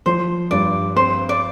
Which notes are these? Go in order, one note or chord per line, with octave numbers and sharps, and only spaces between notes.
F3 C5
G2 D5
C4 C5
D5